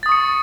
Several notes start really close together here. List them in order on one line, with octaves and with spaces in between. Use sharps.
A6 D#6 C#6 C#7